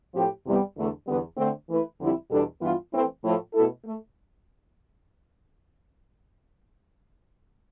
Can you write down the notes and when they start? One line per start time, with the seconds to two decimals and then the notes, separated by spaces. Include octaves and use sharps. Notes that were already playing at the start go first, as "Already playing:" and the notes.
0.14 A2 F3 C4 G4
0.46 E2 C3 E3 G3 B3
0.77 E2 D3 A3
1.07 E2 D3 G3 B3
1.37 D3 A3 C4
1.68 E3 A3 E4 B4
1.99 F2 D3 G3 C4 E4
2.30 E2 B2 G3 D4 A4
2.61 G2 E3 B3 F4
2.92 E3 A3 C4
3.23 A2 F3 A3
3.53 B2 A3 E4 A4
3.85 A3